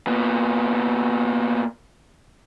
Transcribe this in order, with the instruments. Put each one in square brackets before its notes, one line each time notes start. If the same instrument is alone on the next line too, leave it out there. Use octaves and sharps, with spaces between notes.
[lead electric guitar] A#2 B3